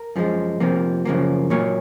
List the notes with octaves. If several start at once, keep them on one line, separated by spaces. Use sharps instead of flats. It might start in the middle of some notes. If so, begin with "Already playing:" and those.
Already playing: A#4
F#2 F3 G#3
F2 C3 F3 A#3
F#2 C#3 F3 A#3
A#2 F#3 A#3 C#5